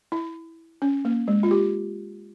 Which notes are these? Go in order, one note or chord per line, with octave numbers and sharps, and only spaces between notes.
E4
C#4
A#3
G#3
F4
G4